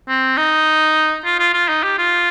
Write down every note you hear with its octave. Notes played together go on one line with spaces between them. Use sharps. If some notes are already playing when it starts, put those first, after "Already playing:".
C4
D#4
F4
F4
F4
D#4
G4
F4